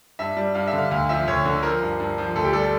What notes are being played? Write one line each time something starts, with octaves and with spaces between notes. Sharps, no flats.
G2 E5
G3
G2 F5
E5
D3
F5
D2 F5
F3 E5
D2 C#5
D3
F3 A#4
G2
G2
F3
D2 A4
G4
G3 A4
A4